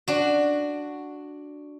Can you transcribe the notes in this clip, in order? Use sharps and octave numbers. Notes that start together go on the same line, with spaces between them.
D4 F#4